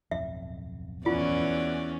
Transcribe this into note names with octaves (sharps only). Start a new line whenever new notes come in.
D1 B1 F2 E5
E2 E3 C#4 F4 F#4 D5